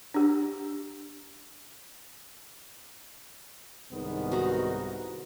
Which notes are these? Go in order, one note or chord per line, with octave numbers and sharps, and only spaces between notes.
D4 G4
C2 G#2 D#3 B3
D#4 F#4